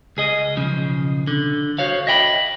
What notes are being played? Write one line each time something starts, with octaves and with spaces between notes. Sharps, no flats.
C#2 G#4 D#5
B1 C#3 F3
D3
F#4 C5 C#5 F5
D#5 E5 G5 B5